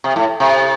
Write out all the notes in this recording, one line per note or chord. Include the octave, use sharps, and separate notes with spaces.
C3
A2
C3